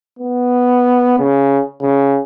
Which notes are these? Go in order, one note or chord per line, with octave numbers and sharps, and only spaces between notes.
B3
C#3
C#3